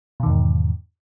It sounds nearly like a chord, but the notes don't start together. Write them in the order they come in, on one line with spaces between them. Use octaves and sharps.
B2 D#3 E2 G#2